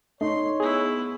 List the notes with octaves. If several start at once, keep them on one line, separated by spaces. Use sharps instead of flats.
A3 D#4 C#5 C6
B3 E4 G#4